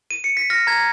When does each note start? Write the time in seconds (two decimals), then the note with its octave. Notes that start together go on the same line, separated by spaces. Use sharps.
0.10 D#7
0.24 C#7
0.37 B6
0.50 F6 A#6
0.67 A#5 G#6